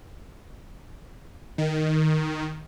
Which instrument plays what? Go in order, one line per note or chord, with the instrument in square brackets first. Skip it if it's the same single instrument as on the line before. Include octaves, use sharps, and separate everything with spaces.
[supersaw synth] D#3